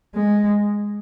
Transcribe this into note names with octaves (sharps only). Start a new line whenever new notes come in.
G#3